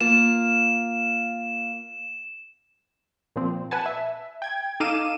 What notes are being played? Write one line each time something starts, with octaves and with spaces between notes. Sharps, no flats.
A#3 F4 E7
A#2 F3 C4
B4 F#5 G#5 A5
E5
G5 G#6
D#4 A4 F5 D6 D#7 E7